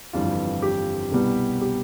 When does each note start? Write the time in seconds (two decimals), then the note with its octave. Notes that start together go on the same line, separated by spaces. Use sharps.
0.13 G1 F2 E3 G3 F4
0.62 G4
1.11 C2 B2 G3 B3
1.61 G4